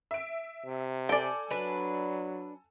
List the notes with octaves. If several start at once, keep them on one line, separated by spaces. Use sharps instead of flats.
E5 D7
C3
A4 D5 G5 G#5
F#3 D4 B4